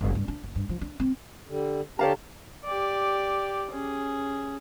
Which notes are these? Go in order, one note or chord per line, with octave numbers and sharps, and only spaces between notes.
F#1
G2
D4
F#1
G2
F3
D4
C4
D3 G3
D3 G4 C#5 F5 A5 A#5
G4 D5
C#4 G#4